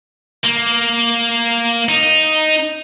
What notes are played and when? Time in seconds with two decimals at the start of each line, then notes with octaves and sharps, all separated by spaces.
0.44 A#3
1.89 D#4